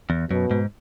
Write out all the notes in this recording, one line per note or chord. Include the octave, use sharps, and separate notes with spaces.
E2
F#2 B2
G#2